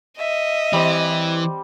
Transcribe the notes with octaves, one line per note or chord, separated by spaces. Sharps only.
D#5 E5
E3 G3 C4